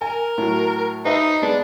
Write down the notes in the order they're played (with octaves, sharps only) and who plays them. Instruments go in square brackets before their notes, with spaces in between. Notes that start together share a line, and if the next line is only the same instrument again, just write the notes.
[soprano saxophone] A#4 [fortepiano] G#5
[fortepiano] A2 F#3
[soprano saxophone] D#4 [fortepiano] B4 C5 E5
[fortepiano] G#3 B3 [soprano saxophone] D4